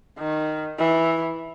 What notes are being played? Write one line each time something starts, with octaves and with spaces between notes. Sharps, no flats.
D#3
E3